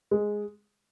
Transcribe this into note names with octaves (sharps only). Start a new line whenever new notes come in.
G#3